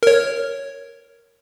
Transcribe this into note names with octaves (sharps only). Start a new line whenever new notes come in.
A#4 C#5